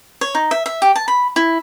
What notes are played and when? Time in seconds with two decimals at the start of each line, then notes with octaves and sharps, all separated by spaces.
0.21 C#5
0.35 D#4
0.51 E5
0.66 E5
0.82 G4
0.95 A5
1.08 B5
1.36 E4